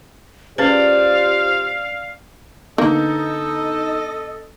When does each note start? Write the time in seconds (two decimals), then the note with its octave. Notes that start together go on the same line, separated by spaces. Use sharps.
0.58 C#4 F4 G4 G#4 B4 C5 D5 F5
2.78 D3 A#3 B3 D#4 A4 D#5